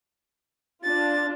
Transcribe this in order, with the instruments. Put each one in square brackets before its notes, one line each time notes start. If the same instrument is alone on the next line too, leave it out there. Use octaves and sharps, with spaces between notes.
[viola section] D4 F4 [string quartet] A6